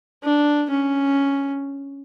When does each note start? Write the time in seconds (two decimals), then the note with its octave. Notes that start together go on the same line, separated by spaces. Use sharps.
0.24 D4
0.70 C#4